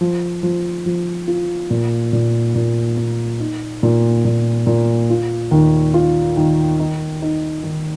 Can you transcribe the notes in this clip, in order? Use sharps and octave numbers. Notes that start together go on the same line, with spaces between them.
F3
F3
F3
F4
A#2
A#2
A#2
A#3
D#4
A#2
A#2
A#2
F4
D#2
F4
D#3
D#4
D#4
D#3